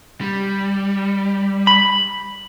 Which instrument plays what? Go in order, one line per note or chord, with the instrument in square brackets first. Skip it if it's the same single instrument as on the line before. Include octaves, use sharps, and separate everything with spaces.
[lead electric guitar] G3
[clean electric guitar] B5